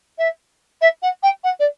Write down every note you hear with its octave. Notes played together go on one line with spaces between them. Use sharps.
E5
E5
F#5
G5
F#5
D5